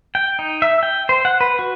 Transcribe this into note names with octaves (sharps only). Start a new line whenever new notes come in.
G5
D#4
E5
G5
C5
F#5
B4
F#4